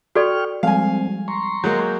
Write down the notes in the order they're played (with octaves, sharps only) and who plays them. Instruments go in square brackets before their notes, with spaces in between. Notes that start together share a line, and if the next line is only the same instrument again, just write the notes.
[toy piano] F#4 A4 D5 [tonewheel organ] G5 C#6 F6
[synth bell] F3 G3 G#3 [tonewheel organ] C4 [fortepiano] F5 G#5
[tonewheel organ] A#5 C6 C#6
[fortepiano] F#3 G#3 A#3 [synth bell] G6